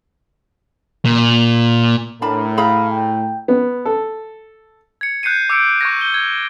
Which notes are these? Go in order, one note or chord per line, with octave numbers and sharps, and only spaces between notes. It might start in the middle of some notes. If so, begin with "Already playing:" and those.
A#2
A2 D4 A#4 A5 B5
G#4 F5 A#5 B5
G5
B3
A4
G#6 C#7
F#6 G6 C7 C#7 D#7
D6 E6 G6 C#7 D7
C#6 D6 F#6 G#6 A#6
C#6 G6 G7
G#6